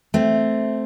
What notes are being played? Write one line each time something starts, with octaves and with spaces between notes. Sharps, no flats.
A3 C4